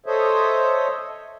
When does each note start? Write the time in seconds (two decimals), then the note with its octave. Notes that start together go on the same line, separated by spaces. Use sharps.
0.06 A4 C5 C#5 D#5 E5